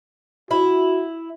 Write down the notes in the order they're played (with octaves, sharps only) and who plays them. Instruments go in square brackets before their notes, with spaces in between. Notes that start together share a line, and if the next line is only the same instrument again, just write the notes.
[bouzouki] E4 [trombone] F#4